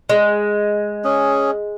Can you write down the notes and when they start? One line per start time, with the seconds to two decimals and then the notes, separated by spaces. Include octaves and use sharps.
0.09 G#3
1.04 C#4 G#4